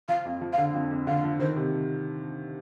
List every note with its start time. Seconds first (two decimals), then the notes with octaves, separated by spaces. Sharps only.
0.08 F3 F5
0.25 F2
0.41 F3
0.53 F5
0.58 D3
0.74 F2
0.91 F2
1.07 D3 F5
1.24 F3
1.39 D#3 C5
1.57 C3